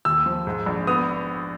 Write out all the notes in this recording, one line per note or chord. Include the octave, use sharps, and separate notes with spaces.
D#2 E6
F3
G#2
A#1
B3 D#6